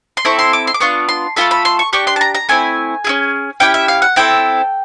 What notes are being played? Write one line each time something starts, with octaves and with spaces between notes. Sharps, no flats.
C6
C4 E4 A4 C#6
C6
D6
C6
D6
B3 D4 F4 C#6
C6
A3 C4 F4 A4 B5
B5
C6
C#6
D4 G4 C#6
C6
A5
A#5
A#5
A3 C4 E4 G#5
C#4 E4 G#4
C#4 E4 G4 G5
E5
F5
F#5
C4 E4 A4 G5